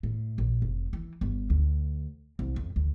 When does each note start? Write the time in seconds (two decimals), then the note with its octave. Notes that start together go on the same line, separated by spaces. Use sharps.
0.03 A2
0.38 A#1
0.62 F1
0.93 E3
1.21 G1
1.50 D2
2.39 C2
2.56 F2
2.76 D2